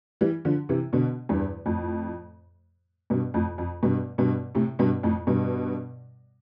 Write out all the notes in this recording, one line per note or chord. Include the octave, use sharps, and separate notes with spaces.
E3 G3
D3 F3
C3 E3
B2 D3
E2 G2
F2 A2
G2 B2
F2 A2
F2
G2 B2
G2 B2
A2 C3
G2 B2
F2 A2
G2 B2